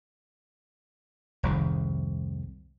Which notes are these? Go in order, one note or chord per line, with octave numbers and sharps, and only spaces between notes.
F1 C2 G#2 D#3